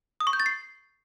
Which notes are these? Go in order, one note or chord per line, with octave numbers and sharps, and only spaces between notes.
D#6
C#6
G6
A6
C7